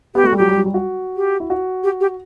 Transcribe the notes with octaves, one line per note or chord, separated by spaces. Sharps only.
B3 G4
A3 F#4
G3
F#3 G4
G3
F#3
G3
F#4
G4
E4
F#4
G4
G4